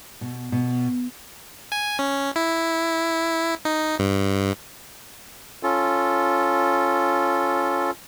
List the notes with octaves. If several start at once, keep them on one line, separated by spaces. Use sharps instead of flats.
B2
B2
G#5
C#4
E4
D#4
G2
C#4 F4 A4